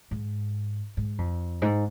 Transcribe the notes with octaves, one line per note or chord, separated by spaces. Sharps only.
G#2
G#2
F2
G#2